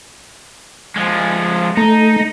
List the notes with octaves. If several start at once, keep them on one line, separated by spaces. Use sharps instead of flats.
F3 G#3
A3 D#4